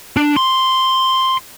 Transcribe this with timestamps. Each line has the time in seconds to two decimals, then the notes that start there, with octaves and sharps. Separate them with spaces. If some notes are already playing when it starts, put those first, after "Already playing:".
0.17 D4
0.36 C6